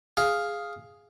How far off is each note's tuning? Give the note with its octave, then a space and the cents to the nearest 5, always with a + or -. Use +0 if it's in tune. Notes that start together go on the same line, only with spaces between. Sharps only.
G#4 +0 F5 +0